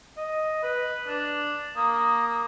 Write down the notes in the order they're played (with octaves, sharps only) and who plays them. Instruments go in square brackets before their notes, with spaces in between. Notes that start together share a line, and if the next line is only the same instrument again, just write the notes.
[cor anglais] D#5
B4
D4
[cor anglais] A#3 [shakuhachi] D#6